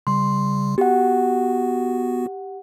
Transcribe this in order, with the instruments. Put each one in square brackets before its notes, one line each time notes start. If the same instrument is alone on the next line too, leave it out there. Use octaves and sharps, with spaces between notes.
[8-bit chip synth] C#3 G3 [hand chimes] C6
[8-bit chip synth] B3 F#4 [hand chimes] G4 F#5